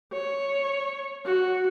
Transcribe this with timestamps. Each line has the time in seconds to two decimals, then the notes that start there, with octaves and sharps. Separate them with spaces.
0.12 C#5
1.25 F#4